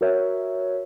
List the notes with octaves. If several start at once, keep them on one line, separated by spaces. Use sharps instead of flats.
F#4 A#4 C#5 E5